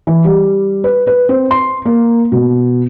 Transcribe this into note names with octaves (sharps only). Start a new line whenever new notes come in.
E3
G3
B4
B4
C4
C6
A#3
B2